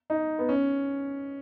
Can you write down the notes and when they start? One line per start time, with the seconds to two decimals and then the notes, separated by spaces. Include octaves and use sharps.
0.10 D#4
0.39 B3
0.49 C#4